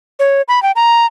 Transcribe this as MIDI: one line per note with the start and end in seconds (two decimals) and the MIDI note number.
0.19 0.42 73
0.48 0.62 83
0.63 0.72 79
0.76 1.06 82